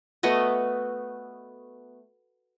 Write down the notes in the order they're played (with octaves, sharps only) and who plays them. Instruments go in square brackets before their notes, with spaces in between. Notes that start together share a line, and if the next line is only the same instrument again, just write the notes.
[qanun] A3 B3 F#4 D#5